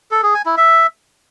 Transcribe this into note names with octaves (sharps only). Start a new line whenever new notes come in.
A4
G#4
G#5
E4
E5